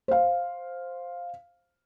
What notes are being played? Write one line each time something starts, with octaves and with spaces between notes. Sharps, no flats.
C5 F5